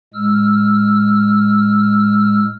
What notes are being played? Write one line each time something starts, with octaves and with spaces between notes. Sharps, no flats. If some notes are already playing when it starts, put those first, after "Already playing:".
A2 G#3 E6 F6